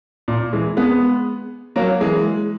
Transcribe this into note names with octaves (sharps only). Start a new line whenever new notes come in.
A#2
E3 G#3
G#3 B3
F#3 A#3
E3 G#3